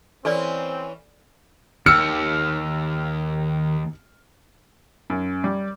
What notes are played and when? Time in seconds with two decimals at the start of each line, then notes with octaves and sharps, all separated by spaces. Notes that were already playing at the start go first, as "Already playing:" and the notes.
0.25 E3 C4 C#4 A4 D5
1.86 D#2 D#3 G4 E6 F6 C#7
5.10 F#2
5.44 G3